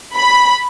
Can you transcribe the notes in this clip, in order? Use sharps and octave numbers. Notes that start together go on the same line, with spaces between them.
B5